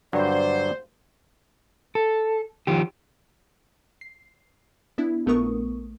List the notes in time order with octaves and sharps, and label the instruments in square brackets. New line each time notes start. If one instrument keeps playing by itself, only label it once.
[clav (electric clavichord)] G2 D3 F#3 [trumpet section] C5 [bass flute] D5
[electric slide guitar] A4
D#3 F3 G4
[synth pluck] C7
B3 D4 E4
A#1 A3 B3 A#4 C#6 D#6